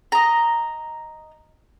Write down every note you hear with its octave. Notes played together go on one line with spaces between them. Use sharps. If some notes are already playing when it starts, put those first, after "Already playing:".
D#5 A#5